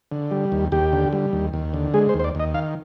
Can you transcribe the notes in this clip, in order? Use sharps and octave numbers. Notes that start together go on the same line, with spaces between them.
D3
G3
D#2
D#2 G4
D3
G3
D#2
D#2
D3
G#3 G#4
C5
D#2
C5
D5
D#2 D#5
D#3 F5